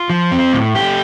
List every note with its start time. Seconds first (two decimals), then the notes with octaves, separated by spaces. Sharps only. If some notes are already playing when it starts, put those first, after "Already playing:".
Already playing: F4
0.10 F3
0.32 C4
0.53 A2
0.75 A3 G4